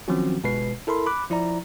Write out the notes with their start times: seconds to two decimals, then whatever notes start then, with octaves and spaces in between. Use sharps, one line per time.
0.08 D#3 F3 F#3 C4 C#4 F#4
0.44 G1 B2 G#3 B4 C7
0.87 E4 A4 A#4 B5 C6
1.06 B5 D6 F#6
1.30 F3 E4 D5 A#5